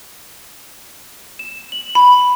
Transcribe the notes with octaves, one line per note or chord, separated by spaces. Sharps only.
E7
F#7
B5